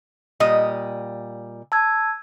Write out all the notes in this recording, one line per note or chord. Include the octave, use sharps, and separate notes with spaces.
A#2 G3 D#5
A5 E6 G#6